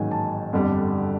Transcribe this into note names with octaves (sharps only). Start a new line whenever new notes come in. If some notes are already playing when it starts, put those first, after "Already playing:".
Already playing: A1 G#2 D#3 F#3 A#3 G#5
A5
G1 F2 D3 G3